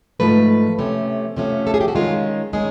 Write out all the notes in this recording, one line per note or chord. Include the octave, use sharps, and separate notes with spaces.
G#2 F3 A3 B4
C3 F3 A3 C#4
C3 F3 A3 C#4
A4
G#4
G4
F#4
D#3 G#3 C#4 F4
D#3 G#3 C#4 G#4